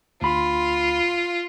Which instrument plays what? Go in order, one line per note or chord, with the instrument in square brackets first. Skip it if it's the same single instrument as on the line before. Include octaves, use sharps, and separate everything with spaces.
[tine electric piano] D2 B5 C6 [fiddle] F4